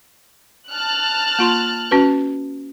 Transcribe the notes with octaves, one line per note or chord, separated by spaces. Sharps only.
A5 F6 F#6
A#3 F4 C6
C#4 F#4 B4